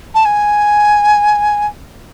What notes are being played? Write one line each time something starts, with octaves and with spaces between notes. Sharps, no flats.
A5
G#5